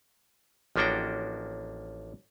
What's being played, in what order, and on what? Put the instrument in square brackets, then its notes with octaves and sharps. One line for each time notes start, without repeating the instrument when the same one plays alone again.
[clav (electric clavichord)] A1 F3 A#3 D4 F#4 G5